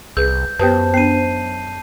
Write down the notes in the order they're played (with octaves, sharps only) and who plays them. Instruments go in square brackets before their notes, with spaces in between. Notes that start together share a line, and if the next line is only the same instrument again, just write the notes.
[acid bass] C2 [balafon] G#4 B4 [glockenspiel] G6
[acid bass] F#2 [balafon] B3 G4 B4 [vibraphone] C5 [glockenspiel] A5
[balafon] B3 D4 [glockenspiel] C7 D#7